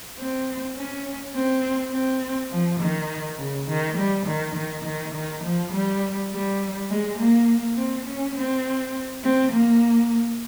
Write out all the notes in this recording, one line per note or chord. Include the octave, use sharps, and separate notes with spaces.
C4
C#4
C4
C4
F3
D#3
C#3
D#3
G3
D#3
D#3
D#3
D#3
F3
G3
G3
G#3
A#3
C4
C#4
C4
C4
A#3